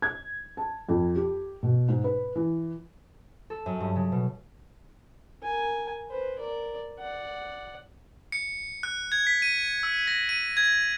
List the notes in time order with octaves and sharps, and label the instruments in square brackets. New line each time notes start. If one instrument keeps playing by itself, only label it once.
[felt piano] G#6
A5
F2
G4
B2
G#2
B4
E3
[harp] A4
F#2
G2
C#3
B2
[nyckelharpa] A#4 G#5
B4 C5
A#4 D5
D5 F#5
[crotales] C#7
F#6
G#6
B6
D#7
E6
A#6
D#7
G#6